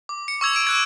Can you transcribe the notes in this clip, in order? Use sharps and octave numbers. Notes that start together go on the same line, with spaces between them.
D6
C#7
C#6 E6 G#6 F7
E6 D7
E6 F#6 G#6